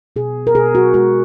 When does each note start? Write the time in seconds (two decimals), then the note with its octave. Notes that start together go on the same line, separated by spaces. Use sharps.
0.16 B2 G#4
0.47 A#4
0.55 B2 G#4
0.75 F#4
0.94 G#3 F#4